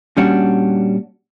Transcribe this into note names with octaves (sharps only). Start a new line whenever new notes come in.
A#2 G3 C#4 D4 F#4